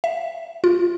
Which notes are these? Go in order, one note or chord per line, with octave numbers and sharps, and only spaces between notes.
E5
F4